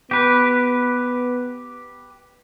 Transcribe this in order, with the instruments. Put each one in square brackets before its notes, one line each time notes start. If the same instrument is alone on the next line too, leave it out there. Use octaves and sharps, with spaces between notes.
[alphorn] B3 [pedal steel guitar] G4 B4